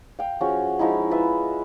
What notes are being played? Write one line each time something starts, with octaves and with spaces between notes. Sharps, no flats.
F5 G5
F3 C#4 F#4 G#4
F3 G#3 D#4 E4
F4 B4 E5